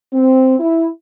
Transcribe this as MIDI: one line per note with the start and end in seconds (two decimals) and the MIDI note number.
0.13 0.55 60
0.60 0.88 64